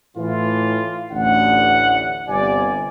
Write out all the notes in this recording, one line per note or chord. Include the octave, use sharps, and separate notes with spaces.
A2 E3 F4
A1 D2 F#5
G1 C3 D5 G#5